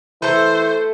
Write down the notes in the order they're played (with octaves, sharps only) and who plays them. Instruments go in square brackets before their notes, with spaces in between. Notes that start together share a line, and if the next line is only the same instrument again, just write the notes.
[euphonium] E3 [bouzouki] A3 A4 [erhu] C5